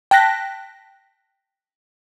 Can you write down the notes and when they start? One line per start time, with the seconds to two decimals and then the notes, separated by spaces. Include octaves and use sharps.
0.11 G5 A5 F#6 A#6 B6